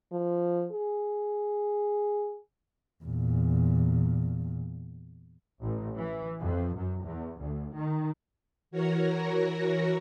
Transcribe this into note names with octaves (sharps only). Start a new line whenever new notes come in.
F3
G#4
E2 A#2
A1
E3
F2
F#2
E2
D2
D#3
E3 F#4 A#4 C#5 A#5